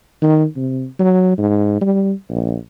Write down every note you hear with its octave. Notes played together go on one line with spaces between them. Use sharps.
D#3
C3
F#3
G#2
G3
A#1